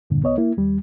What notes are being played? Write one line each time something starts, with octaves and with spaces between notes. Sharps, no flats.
E2 G2 A#2 D3
C2 B3 C#5 D#5
A#3 E4
D#2 G3